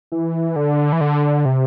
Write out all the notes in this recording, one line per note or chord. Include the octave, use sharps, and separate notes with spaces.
E3
D3
E3
D3
C3